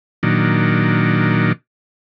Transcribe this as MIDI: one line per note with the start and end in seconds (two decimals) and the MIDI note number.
0.23 1.52 46
0.23 1.52 51
0.23 1.52 54
0.23 1.52 62